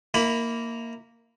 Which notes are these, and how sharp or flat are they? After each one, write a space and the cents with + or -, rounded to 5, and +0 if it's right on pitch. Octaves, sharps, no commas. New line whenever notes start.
A#3 -10 E4 -30 B5 +5